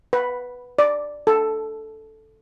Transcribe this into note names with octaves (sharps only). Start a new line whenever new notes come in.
B4
D5
A4